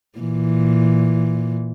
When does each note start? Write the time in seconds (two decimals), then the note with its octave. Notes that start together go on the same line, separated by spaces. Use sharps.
0.19 A#2 E3